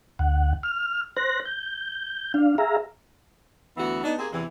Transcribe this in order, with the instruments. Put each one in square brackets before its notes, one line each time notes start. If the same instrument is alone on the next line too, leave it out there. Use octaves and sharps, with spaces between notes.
[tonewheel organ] D2 F#5
F6
C5 F#6 A#6
G6
D4 F5
G#4 E5 F5 A#5
[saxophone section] D2 E3 B3 F#4
B3 D4 D#4
A#3 C4 G4 G#4
E2 C3 E3